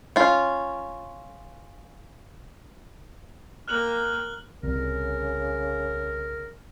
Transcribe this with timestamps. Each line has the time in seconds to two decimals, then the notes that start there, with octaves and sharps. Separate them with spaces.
0.16 C#4 F4
3.68 A#3 G5 F6 F#6 F#7
4.63 C2 C#3 A#4